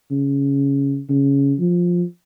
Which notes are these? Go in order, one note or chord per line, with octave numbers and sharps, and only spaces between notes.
C#3
C#3
F3